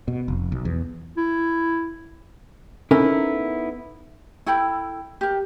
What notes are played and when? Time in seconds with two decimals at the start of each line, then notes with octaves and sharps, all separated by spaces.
0.08 B2
0.28 F1
0.52 B1
0.65 E2
1.17 E4
2.91 B3 C#4 D#4 E4 A4 A#4
4.46 E4 A4 G5 B5
5.21 G4 A#4